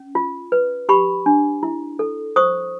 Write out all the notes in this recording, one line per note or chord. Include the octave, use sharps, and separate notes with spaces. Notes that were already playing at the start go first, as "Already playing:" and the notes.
Already playing: C#4
F4
B4
G4 B5 C#6
D4
E4
A4
C5 C#6 D#6